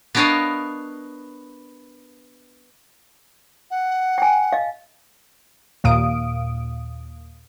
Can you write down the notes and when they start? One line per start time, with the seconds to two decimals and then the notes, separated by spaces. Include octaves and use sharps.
0.15 B3 D4 A#4 C#5 D#5 F5
3.71 F#5
4.18 G5 G#5
4.52 D#5 F5
5.84 D#2 A#2 F5 D#6 D7